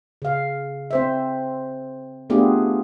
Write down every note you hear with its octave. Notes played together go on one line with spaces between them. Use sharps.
C#3 F5
C4 C5 E5
A3 B3 D4 F4 G4 G#4